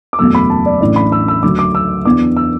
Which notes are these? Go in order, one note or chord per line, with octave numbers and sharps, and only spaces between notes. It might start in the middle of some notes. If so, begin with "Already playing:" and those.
D6
F#1 E2 B2 F#3 A3 E6
B5
A5
D5
A1 A2 E3 D4 D5
B5
E6
E6
D2 D3 F#3 D6
D6
E6
E2 E3 B3 D4 D6
E6